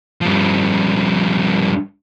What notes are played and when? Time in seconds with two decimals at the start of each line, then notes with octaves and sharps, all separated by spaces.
0.21 G2 F3